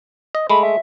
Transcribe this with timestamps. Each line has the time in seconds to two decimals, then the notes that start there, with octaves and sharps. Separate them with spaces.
0.35 D#5
0.50 G#3 A3 B5
0.63 E5